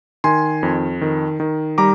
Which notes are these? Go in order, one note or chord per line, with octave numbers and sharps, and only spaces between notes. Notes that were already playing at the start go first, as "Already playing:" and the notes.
D#3 G#5 C6
F2
D#3
D#3
G3 A#5 D6